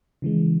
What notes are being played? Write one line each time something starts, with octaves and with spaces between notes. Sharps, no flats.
C#3 E3 G#3